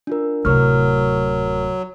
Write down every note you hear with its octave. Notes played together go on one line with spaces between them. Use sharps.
D4 F4 A#4
D1 C3 F#3 A#4 C#6 F6